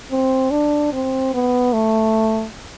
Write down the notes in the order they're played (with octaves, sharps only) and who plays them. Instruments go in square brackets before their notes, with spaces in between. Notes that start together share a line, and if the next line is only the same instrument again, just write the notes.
[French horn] C4
D4
C4
B3
A3